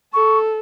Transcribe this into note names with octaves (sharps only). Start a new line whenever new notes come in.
A4 C#6